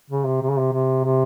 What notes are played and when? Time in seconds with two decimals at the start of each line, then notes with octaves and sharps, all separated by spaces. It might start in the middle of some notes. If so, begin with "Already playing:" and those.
0.10 C#3
0.26 C3
0.42 C3
0.50 C#3
0.58 C3
0.73 C3
1.04 C3